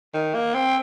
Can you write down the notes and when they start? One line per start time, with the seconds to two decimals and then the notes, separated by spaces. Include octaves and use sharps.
0.14 D#3
0.34 A#3
0.54 C4